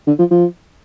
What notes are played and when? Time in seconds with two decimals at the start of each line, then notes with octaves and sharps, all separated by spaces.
0.07 D3
0.19 F3
0.31 F3